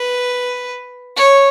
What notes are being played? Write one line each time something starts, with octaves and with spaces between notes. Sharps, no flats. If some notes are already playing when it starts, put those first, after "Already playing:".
Already playing: B4
C#5